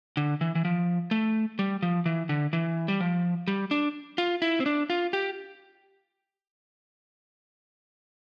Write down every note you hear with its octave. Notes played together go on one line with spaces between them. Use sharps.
D3
E3
E3
F3
A3
G3
F3
E3
D3
E3
G3
F3
G3
D4
F4
E4
C4
D4
F4
G4